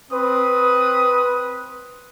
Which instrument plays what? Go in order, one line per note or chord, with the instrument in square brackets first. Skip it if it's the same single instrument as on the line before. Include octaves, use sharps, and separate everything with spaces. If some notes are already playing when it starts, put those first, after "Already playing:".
[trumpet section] C4 B4 D#6